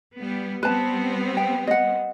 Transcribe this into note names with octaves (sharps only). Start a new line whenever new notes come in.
G3 B3
G3 B3 C4 B4 A5
G5
D#5 F#5